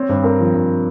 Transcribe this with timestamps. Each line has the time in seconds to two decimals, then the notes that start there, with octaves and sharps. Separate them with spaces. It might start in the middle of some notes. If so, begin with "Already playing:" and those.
Already playing: C4 C#5
0.09 G2 C5
0.23 C4 A#4
0.39 F3
0.55 G2